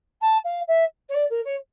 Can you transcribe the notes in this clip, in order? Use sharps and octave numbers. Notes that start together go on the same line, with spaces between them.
A5
F5
E5
C#5
D5
A#4
C#5